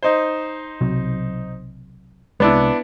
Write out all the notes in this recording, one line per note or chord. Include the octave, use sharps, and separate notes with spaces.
D#4 C5
B1 C3 F#3
C2 C3 G#3 B3 D4 E4